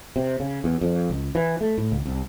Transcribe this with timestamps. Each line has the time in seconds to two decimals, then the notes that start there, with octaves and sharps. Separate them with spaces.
0.16 C3
0.40 C#3
0.64 E2
0.81 F2
1.10 C#2
1.35 E3
1.61 A3
1.78 A2
1.92 C#2
2.06 C2